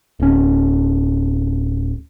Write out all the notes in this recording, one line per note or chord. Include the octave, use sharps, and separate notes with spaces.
D1 C#4